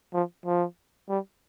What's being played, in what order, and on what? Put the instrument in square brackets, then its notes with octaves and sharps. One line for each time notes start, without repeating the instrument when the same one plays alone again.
[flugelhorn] F3
F3
G3